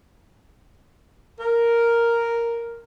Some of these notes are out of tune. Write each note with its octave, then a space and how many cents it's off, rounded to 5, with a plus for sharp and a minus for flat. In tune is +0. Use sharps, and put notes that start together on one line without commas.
A#4 +0